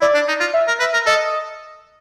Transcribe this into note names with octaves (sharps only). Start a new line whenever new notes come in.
E4 D5
D4
D#4
F4
E5
A#4
B4 E5
A#4
A4 D#5